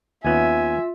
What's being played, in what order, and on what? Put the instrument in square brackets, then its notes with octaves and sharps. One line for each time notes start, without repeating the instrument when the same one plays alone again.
[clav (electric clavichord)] D#2 B3 C#4 [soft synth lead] F4 [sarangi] E5 [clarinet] G#5